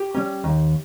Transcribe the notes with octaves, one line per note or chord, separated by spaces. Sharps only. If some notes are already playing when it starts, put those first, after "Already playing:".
Already playing: G4
G3 C#4
D#2